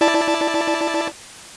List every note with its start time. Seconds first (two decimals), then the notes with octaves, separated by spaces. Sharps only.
0.01 E4 D5 A5